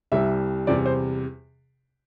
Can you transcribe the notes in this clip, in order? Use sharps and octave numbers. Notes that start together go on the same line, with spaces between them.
C2 C3 G3 E5
E2 C3 G3 D5
C5